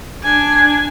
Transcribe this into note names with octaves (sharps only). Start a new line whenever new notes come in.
D4 G#5